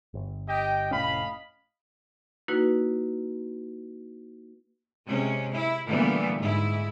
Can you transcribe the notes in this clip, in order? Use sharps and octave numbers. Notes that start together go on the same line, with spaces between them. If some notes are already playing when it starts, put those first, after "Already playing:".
G1
G4 D#5 G5
F1 A2 C#4 D#5 F5 B5
A#3 D#4 E4 F#4 B4
C3 G#3 C#4
E4
A#2 D3 E3 G3 A3 B3
G#2 E4